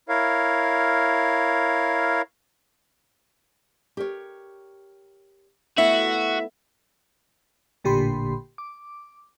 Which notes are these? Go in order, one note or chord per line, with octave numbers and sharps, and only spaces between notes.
E4 A#4 C#5 F5
G4 A#4 C#5
A3 B3 E4 F#4 E5
A1 A#2 D3 G4 B5 C6
D6